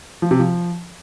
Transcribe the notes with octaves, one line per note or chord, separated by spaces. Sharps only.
F3
C3
F3